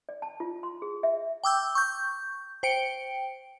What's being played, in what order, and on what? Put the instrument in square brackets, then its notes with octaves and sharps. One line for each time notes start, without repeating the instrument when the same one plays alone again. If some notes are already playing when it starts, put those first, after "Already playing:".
[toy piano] D5
A5
F4
C6
G#4
E5
[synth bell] G5 D6 E6 G6
C#6 G6
C5 G5 C#7 D7